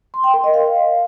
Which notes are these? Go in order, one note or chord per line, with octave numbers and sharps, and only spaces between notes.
C6
G5
A#4
D#5
F5